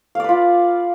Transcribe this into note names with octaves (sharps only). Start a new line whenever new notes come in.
F4 B4 D5 F5